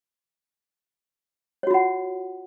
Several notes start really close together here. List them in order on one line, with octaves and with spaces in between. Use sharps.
C#5 F#4 F4 F#5